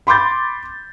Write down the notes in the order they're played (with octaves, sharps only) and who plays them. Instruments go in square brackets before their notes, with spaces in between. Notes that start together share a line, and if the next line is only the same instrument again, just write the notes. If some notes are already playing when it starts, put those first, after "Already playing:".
[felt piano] B5 C6 D6 G6 A6